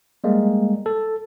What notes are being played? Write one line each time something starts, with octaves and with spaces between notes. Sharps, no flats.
G3 G#3 A#3
A4